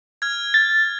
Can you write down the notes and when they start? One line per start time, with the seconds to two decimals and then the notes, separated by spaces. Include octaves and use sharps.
0.22 F6 G#6
0.54 A6